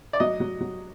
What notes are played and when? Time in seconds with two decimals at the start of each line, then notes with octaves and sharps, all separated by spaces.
0.13 D5
0.20 F#3 D#5
0.40 F#3
0.61 F#3